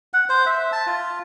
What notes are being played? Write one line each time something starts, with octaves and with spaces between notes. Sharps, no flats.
F#5
C5
E5
A5
F4